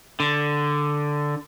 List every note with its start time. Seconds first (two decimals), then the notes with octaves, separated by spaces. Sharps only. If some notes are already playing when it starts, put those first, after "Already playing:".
0.20 D3